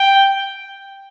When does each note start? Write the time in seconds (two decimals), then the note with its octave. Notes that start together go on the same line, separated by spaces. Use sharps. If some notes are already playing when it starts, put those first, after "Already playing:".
Already playing: G5